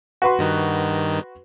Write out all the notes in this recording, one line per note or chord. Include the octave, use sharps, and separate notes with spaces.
F#4 B4 C6
G2 D#3 D#4